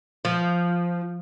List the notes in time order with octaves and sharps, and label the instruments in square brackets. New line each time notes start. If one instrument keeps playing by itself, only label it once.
[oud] F3